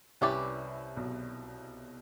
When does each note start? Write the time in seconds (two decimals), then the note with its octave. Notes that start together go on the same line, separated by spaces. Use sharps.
0.21 C2 C3 C#4 E4 G4 B4 D5
0.97 B1 B2